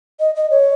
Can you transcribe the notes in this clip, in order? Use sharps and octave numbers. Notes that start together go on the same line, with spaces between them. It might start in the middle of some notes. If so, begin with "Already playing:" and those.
D#5
D#5
C#5